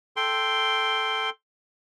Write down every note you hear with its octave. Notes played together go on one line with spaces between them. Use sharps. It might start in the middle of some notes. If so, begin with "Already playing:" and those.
A4 G5 C6